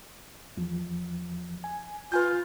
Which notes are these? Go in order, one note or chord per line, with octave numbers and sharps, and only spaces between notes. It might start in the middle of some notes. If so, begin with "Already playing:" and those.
E2 F3
G#5
F4 B4 G#5 G6